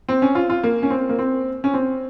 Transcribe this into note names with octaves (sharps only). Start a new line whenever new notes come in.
C4
C#4
F4
F4
A#3
C#4
C4
A#3
C4
C#4
C4